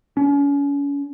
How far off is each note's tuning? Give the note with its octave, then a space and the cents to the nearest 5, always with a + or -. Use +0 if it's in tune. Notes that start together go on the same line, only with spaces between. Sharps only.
C#4 +35